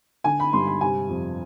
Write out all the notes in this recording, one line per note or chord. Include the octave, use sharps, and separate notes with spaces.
D3 G#5
B5
G2 C6
B5
C3 G#5
F2